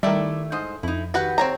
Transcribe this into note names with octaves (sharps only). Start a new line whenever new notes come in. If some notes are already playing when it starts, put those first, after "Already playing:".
D#3 G3 A3 E4 D5 E5
G#2 C5 D#5
F2 D#4 E4
D#3 F#4 G4 B4 F#5
C4 C#5 A#5